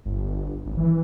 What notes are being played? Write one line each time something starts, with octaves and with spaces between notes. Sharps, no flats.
G1
G#1
E3